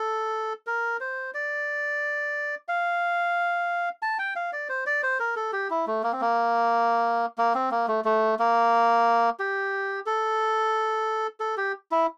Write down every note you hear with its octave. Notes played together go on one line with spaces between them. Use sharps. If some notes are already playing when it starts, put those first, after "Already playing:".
Already playing: A4
A#4
C5
D5
F5
A5
G5
F5
D5
C5
D5
C5
A#4
A4
G4
E4
A3
A#3
C4
A#3
A#3
C4
A#3
A3
A3
A#3
G4
A4
A4
G4
E4